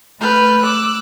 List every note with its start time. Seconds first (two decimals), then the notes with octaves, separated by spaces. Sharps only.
0.20 A3 B4 F6 G6
0.61 D6 E6 F#6